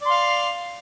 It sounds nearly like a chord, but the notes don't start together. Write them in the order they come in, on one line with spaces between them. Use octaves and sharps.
D5 C6 F5